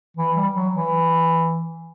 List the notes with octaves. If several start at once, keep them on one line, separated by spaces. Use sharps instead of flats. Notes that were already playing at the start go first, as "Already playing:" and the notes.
E3
G3
F#3
E3